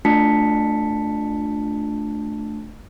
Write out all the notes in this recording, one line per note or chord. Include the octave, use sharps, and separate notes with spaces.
A3 D4 F4 A5 B6 C#7